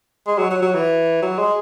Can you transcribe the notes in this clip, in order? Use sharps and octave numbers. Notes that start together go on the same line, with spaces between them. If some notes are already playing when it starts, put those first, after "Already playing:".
G#3
F#3
F#3
F#3
E3
F#3
G#3